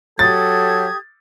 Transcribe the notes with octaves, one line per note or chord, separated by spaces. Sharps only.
F#3 G4 A4 D#6 G#6 A6